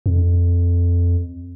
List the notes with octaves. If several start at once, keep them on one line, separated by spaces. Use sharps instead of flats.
F2